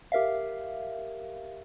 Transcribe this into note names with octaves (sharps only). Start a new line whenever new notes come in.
G4 A#4 E5 F5